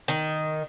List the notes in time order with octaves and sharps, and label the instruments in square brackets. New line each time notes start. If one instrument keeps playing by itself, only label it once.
[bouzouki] D#3